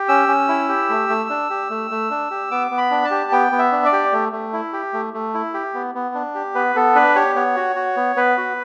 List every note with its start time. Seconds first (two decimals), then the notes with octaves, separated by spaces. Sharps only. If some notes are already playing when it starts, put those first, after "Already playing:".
Already playing: G4
0.08 C#4 E6
0.28 C#4
0.49 E4
0.69 G4
0.89 A3
1.09 A3
1.29 D4
1.50 G4
1.70 A3
1.91 A3
2.10 D4
2.31 G4
2.51 B3 D6
2.71 B3
2.78 B5
2.91 D4
3.05 A5
3.11 G4
3.32 B3 G5
3.52 B3
3.59 E5
3.72 D4
3.85 D5
3.92 G4
4.13 A3
4.32 A3
4.53 E4
4.73 G4
4.93 A3
5.13 A3
5.34 E4
5.54 G4
5.74 B3
5.95 B3
6.15 D4
6.35 G4
6.55 B3 B4
6.75 B3 A4
6.95 D4 B4
7.16 G4 C#5
7.36 B3 C#5
7.56 F#4
7.76 F#4
7.96 B3
8.16 B3 B4
8.37 F#4